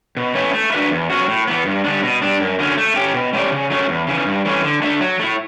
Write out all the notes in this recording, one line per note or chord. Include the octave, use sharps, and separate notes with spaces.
B2
A3 C#4 E4 B4
A3
D4 F#4 B4 E5
E2
B2 F#3 C#4 F#4
A2
E3 B3
G2
D3 G3 D4
B2
G3 D4
F#2
D3 F#3 C#4
A3
C#4 G4
B2
A3 C#4 G4 D5
C#3
F#3 A3 C#4
E2
C#3 E3
G2
E3 A3 C#4
D3
A3 D4 A4 E5
F#3
A3 E4